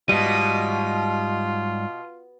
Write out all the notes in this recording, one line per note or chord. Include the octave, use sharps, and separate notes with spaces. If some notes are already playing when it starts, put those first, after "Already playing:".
G#2 B2 G3 F4 G4 D#5